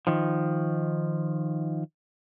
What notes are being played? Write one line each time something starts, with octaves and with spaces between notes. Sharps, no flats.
D#3 F3